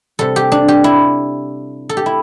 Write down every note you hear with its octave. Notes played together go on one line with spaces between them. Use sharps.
C3 G3 A4
G4
D4
G4
E4
A4
G4
E4